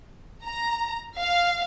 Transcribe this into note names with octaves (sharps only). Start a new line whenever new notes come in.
A#5
F5